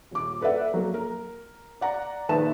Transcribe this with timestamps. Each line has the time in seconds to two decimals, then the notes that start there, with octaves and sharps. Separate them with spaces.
0.11 D#1 D6
0.41 A4 B4 D5 E5 F#5
0.74 F#3 A#3
0.94 A#4
1.81 D5 F#5 A#5
2.29 A#1 D#3 B4 E5 A5 E7